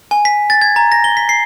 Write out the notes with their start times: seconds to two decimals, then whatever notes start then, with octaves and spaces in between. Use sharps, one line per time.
0.11 G#5
0.25 B6
0.50 A6
0.62 G#6
0.76 A#5
0.92 A#6
1.04 G7
1.17 B6
1.29 C7